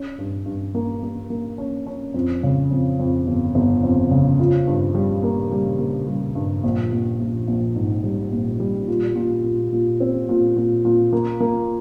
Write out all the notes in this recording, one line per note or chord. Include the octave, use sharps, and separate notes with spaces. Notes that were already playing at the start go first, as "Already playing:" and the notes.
Already playing: C#4
G2
G2
A#3
A#3
A#3
C#4
C#4
F2
C#3
F2
F2
G1
G1
F2
C#3
F4
G2
G3
A#3
G3
A#3
G3
G2
A#1
A#1
A#1
A#1
G#2
G3
A#1
G3
A#2
A#2
A#2
A#2
C4
A#2
A#2
A#2
A#3
A#3